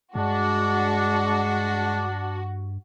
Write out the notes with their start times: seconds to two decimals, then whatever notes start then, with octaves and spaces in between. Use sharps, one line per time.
0.15 G2 G#3 D4 F#4